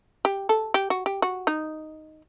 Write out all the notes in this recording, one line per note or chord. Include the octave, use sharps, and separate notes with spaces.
G4
A4
G4
F#4
G4
F#4
D#4